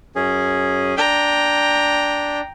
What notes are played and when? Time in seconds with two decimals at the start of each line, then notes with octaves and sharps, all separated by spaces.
0.16 F#2 C#4 G#4
0.97 D4 G5 A#5